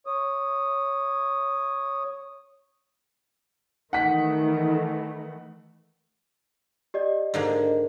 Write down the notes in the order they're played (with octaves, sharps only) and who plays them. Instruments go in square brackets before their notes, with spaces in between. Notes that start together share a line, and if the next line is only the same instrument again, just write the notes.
[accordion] C#5 D#6
[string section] D#3 E3 A3 [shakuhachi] D#4 [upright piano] F#5 B6
[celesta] G4 D5 D#5
[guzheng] G#2 D3 A#3